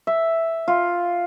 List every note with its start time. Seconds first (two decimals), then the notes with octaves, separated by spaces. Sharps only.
0.07 E5
0.68 F4